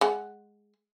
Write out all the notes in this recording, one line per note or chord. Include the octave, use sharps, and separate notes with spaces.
G#3 F#5